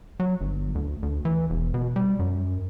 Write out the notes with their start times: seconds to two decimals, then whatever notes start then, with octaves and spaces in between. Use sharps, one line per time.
0.20 F#3
0.41 G1
0.75 D2
1.03 D2
1.25 E3
1.50 E1
1.74 B2
1.96 G3
2.19 F#2